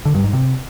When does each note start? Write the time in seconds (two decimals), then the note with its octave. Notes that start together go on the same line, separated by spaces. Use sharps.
0.05 D3
0.15 G2
0.24 G#2
0.33 C3